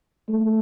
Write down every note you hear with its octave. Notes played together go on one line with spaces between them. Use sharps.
A3